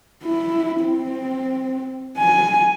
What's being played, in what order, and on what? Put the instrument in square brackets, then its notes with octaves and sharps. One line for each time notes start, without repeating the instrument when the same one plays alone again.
[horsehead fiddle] E4
C4
G#5